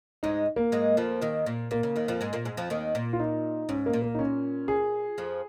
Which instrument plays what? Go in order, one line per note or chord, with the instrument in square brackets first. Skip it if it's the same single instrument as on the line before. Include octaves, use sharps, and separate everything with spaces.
[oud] G#2 G#3 [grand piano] D#4
[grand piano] A#3
[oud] G#2 G#3
F2 F3
D#2 D#3
A#2
[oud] A#2 [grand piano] A#3
[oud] C#3
D#2 D#3
F2 F3
G#2 G#3
A#2 A#3
G#2 G#3
F2 F3
D#2 D#3
A#2
[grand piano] F4
D#4
[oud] G#2 [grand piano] C#4
[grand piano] A#3
[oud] A#2
[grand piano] A#3
D#4
C#4
G#4
[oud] F2 F3